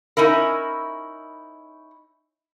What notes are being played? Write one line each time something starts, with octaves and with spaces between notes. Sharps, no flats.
C#4 D#4 E4 A#4